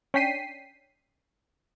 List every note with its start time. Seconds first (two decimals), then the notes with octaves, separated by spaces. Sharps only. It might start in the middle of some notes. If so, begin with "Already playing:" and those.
0.14 C#4 D4 G5 B6 C7 D#7